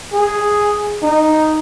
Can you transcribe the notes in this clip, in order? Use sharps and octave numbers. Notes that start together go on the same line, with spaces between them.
G#4
D#4